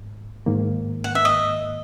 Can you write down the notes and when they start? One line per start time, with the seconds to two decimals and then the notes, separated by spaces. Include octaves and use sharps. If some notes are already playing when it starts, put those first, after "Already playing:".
Already playing: G#2
0.46 G#2 D#3 A#3
1.04 F#5
1.15 E5
1.25 D#5